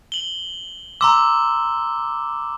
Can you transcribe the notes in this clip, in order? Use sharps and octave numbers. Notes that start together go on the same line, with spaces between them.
F#7 G7
A#5 C6 D6 E6